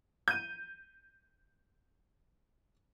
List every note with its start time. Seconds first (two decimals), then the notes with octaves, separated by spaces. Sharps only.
0.28 G6 D#7